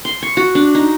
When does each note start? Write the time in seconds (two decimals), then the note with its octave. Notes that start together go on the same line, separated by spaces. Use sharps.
0.05 C6
0.22 C#6
0.37 F#4
0.55 D4
0.75 D#4